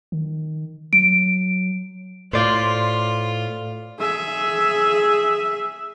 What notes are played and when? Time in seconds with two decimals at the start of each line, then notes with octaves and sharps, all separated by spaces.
0.12 D#3
0.93 F#3 D7
2.33 A2 F4 C5 D5
3.99 G#4 E5